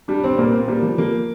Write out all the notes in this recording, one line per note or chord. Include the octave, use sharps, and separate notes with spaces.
G3 D4
C4
A#2 A#3
C4
G3 A#3
F3
F3 A#3